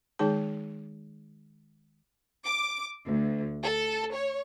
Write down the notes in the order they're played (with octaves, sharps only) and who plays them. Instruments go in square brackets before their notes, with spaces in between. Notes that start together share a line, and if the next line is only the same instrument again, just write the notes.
[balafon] D#3 G#3 D#4 G#4 A5
[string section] D6
D2
A4
C#5